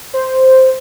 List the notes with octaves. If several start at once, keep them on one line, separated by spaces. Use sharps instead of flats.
C5